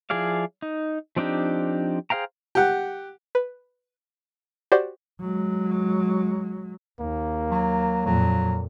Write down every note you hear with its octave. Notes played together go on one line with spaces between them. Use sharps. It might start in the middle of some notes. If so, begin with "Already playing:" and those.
F3 E4 G#4 D5 F5
D#4
F3 C4 D4 D#4 G4
G#4 C5 F5 G5 A#5
G4 F#5
B4
F#4 G4 C5 D5
F#3 G#3
D#2 A#3
F#3
F2 A#2 F#3